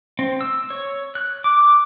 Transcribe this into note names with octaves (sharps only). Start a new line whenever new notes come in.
C4
E6
C#5
F#6
D6